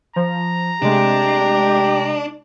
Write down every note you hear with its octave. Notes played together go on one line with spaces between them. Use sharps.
F3 A#5
C3 G#3 A3 D4 G4